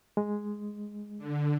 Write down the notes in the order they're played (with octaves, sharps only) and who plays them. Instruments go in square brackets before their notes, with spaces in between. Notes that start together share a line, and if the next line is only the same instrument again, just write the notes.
[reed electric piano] G#3
[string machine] D3